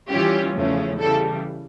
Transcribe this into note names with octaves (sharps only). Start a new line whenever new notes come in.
E3 G3 C#4 F4 G4
E2 C#3 F3 A3 C#4
C#3 E3 G3 A4